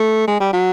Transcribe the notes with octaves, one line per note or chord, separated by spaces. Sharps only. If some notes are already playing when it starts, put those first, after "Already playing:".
Already playing: A3
G#3
G3
F#3